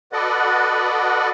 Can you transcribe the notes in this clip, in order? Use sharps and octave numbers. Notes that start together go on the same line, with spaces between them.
F#4 A4 B4 D5 D#5 F#5